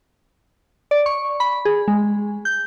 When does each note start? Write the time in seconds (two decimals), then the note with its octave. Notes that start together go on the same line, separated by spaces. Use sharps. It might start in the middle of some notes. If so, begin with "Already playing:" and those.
0.91 D5
1.06 C#6
1.40 B5
1.65 G#4
1.88 G#3
2.45 G6